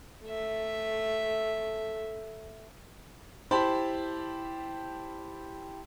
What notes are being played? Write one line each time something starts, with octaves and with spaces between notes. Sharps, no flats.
A3 E5
E4 G4 C5 A5 B5 C6